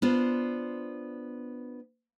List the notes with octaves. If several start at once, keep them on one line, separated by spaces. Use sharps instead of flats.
B3 D4 F4 C5